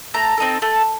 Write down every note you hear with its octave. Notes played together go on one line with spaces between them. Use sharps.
A3 A#5
C4 D#4 A4
A3